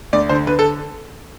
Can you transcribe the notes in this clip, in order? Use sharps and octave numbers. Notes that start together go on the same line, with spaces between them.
D2 D5
D3 C5
D3 B4
A4